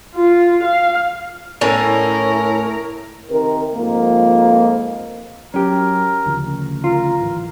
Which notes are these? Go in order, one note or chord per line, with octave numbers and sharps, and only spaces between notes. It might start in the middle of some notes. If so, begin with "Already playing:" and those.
F4
F5
A2 C#4 E4 A#4
C3 D#3 A#4
F2 G#2 F3 A#3
F#3 C#4 G4 A#4
D2 C#3 F3
F4 A#4
D1 G#1 E3